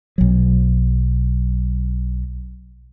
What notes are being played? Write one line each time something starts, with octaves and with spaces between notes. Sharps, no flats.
B1 F#3